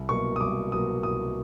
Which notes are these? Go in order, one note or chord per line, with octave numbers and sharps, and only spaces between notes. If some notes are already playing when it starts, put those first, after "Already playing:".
Already playing: C2
B2 F#3 A#3 C#6
D#6
C2 D6
B2 F#3 A#3 D#6
C2 D#6